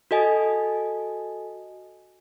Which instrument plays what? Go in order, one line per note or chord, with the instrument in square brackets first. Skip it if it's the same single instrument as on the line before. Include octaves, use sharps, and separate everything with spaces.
[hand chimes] F#4 A4 D#5 G#5